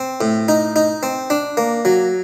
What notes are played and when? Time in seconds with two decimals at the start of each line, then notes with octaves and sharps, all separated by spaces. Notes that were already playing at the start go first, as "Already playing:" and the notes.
Already playing: C4
0.21 A2
0.48 D#4
0.76 D#4
1.03 C4
1.30 D4
1.57 A#3
1.85 F#3